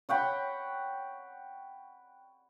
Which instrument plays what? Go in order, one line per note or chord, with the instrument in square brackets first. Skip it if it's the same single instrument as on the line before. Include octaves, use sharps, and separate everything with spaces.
[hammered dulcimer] C#5 F#5 G5 B5